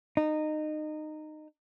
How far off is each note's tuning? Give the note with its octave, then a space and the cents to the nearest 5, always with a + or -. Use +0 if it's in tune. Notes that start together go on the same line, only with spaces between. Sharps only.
D#4 -20